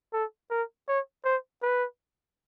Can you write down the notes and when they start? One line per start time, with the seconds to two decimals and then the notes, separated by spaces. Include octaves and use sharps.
0.13 A4
0.51 A#4
0.88 C#5
1.25 C5
1.63 B4